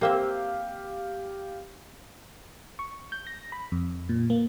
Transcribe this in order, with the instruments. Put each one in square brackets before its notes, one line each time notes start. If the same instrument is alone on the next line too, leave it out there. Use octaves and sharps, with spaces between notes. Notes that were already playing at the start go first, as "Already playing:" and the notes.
[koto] A#3 C4 E5 [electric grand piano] G4 F5
[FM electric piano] C#6
G6
A#6
B5
F2
A#2
A#3